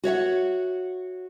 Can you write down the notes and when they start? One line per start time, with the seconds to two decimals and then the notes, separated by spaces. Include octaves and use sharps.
0.04 F#4 C#5 E5 F#5